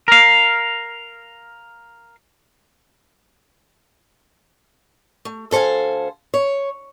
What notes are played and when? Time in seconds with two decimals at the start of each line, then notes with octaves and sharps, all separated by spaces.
0.08 A#4 F5
5.25 A3
5.51 D2 A4 C5 F5 G#5
6.34 C#5